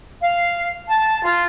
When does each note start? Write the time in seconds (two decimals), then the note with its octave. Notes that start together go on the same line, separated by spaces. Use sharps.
0.21 F5
0.89 A5
1.24 F4